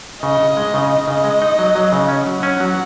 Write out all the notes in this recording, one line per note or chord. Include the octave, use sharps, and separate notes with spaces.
C#3 D#5
C#3
G#3
C#3
D#4 D#5
C#3
G#3
D#4
F#3
F#3
C#3
C#4
F#3 F#5
C#4
F#3